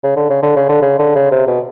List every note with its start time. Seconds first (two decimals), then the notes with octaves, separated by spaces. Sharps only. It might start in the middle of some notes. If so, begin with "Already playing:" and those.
0.04 C#3
0.17 D3
0.30 C#3
0.43 D3
0.56 C#3
0.69 D3
0.82 C#3
1.00 D3
1.15 C#3
1.32 C3
1.48 B2